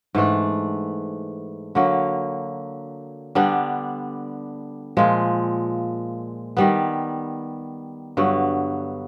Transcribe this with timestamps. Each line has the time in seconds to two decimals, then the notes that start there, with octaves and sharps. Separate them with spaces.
0.15 G#2 E3 A3 D4
1.75 D3 F#3 A#3
3.35 D3 G3 B3 D4
4.97 A#2 F3 G#3
6.57 D#3 G3 B3
8.17 G2 D3 F#3 B3